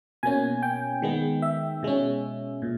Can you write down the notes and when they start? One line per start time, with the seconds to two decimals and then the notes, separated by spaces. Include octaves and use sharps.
0.23 B2 A#3 C#4 G#5
0.63 G5
1.02 D#3 G#3 B3
1.42 E5
1.83 B2 G#3 C#4
2.62 A#2